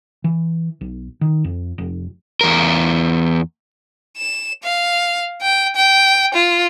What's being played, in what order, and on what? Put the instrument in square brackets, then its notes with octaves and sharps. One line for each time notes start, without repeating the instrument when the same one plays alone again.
[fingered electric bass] E3
B1
D#3
F2
F1
[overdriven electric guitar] E2 A#4
[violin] E7
F5
G5
G5
F4